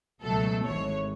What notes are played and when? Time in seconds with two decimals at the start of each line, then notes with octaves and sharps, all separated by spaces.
0.22 C#2 B2 F#3 A3 A4
0.64 G#1 G#2 E3 C#5